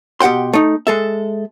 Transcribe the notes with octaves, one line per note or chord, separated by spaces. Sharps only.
B2 G4 F#5 G5 C6
A3 D#4
G#3 A4 E5